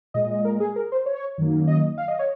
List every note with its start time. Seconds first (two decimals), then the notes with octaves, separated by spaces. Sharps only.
0.14 A#2 G#3 D#5
0.30 D#5
0.45 A#4
0.60 G#4
0.76 A#4
0.92 C5
1.06 C#5
1.38 F#2 D#3 F#3 A#3
1.67 D#5
1.98 F5
2.08 D#5
2.19 C#5